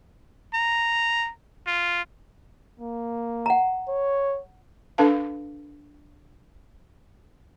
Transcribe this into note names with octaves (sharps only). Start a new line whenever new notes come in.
A#5
F4
A#3
F#5 A#5
C#5
D4 A4 B4 F5 A5